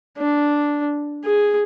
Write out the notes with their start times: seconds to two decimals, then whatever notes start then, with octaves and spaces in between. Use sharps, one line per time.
0.18 D4
1.25 G#4